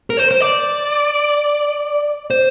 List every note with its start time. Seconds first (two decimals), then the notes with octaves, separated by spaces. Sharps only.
0.10 A#4
0.17 C5
0.31 C5
0.41 D5
2.31 C5